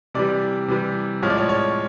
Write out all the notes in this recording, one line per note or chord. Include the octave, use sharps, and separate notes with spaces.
C3 E3 G3 D5
C3 E3 G3
A2 F3 G#3 C#5
D5
C#5
C#5